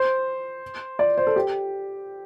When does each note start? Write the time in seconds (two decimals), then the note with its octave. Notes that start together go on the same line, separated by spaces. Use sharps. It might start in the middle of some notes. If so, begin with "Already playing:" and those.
Already playing: C5
0.99 D5
1.17 C5
1.27 A4
1.36 G4